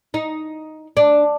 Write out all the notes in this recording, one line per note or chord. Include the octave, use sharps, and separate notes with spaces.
D#4
D4